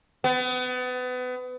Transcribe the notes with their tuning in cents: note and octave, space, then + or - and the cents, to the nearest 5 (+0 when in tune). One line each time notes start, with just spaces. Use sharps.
B3 +30